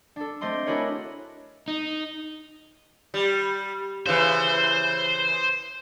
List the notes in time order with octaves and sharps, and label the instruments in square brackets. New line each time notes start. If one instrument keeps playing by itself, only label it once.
[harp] D4 A4
A3 C4 D#5 C6 D6
D4 E4 F#4 G#4 A#4 C#5
[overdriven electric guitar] D#4
[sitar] G3
[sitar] C#3 E3 [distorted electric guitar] C5